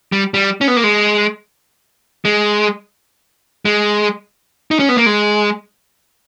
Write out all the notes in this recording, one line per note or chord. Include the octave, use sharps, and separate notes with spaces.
G3
G3
C#4
B3
A#3
G#3
G#3
G#3
D#4
C#4
B3
A#3
G#3